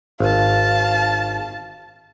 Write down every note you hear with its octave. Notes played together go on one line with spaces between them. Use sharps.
G#1 F5 A5